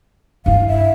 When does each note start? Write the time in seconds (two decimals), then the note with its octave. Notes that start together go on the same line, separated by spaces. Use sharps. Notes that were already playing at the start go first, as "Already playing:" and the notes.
0.46 G2 E4 F5
0.68 E5